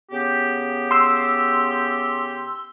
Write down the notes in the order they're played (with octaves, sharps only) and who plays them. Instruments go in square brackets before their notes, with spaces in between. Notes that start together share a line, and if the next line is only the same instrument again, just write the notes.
[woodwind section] C#3 B3 G4
[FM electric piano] C6 E6